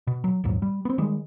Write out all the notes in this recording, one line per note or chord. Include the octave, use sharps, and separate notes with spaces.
B2
F#3
A#1 D#2 G#2 F#3
G3
B3 C4
D#3 G3 G#3